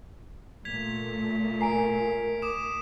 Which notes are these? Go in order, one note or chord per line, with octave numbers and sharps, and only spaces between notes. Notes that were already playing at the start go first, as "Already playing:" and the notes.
A#2 A3 G#6 B6 F7
A#4 G#5 A#5 C7 D7
D6 D#6 E7